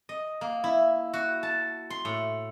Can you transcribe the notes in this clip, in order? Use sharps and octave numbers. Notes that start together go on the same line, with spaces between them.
D#5
A#3
E4
F#4
A5
C6
A2